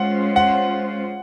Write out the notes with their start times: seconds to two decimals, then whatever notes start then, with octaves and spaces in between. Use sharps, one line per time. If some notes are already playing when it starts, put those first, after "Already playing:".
Already playing: G#3 C#4 F4 C5 F#5
0.36 F#5